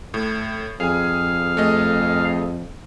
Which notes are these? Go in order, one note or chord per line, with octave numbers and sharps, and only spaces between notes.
A2
F2 G#4 F5 G#5
A3 G#4 D#5